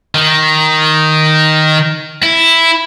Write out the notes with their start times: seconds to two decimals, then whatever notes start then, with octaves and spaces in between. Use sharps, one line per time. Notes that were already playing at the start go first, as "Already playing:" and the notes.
0.15 D#3
2.23 E4